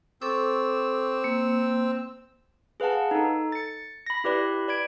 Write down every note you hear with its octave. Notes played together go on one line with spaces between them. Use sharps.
C4 A4 C#6 D6 E6
A#3
G#4 B4 F5 F#5 A5
D#4 A4
A6 C#7
B5 A#6
E4 G4 B4 D5 B5
D5 B5 G#6 D7